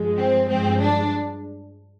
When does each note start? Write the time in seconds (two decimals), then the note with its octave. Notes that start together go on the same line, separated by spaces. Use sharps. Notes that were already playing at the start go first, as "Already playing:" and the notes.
Already playing: G2 F3 G#3
0.17 C4
0.49 G2 F3 G#3 C4
0.81 D4